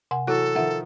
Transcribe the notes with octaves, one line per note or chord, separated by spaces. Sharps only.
C3 F#5 G#5
E3 F#3 E4 F#4 A4 F#6
D#3 F3 E5 F#5